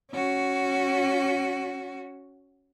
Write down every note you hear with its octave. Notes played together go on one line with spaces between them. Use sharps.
C#4 F#4